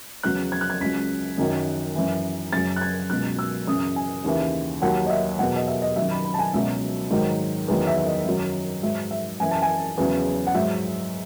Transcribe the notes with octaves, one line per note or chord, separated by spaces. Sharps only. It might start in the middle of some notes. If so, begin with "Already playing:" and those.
E2 C#3 F#3 F#6
G#6
F#6
G#6
C#2 C#3 F#3 B6
F#2 D#3 F#3
F#2 E3
F#2 C#3 F#3 A6
F#6
G#6
C#2 B2 F#3 F#6
E6
F#2 C#3 E3 D#6
G#5
D#2 C#3 E3
D#2 D#3 F#3 F#5
D#5
E5
E2 B2 F#3 F#5
D#5
E5
D#5
F#2 D#3 F#3 E5
B5
B5
A5
G#5
C#2 B2 F#3 E5
G#2 D#3 F#3
E2 D#3 F#3
E5
E5
D#5
F#2 D#3 F#3
G#2 F#3 E5
E5
F#2 E3 G#5
A5
G#5
E2 C#3 F#3
F#5
G#2 F#3 E5